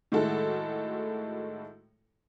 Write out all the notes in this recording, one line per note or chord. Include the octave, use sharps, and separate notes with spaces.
A2 D#3 G#3 E4 F#4 A4